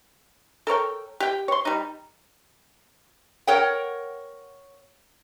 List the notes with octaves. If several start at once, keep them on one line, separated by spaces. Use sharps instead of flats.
A4 A#4 C#5 G5
G4 G5
C#5 C6
G3 D#4
A#4 C#5 F#5 G5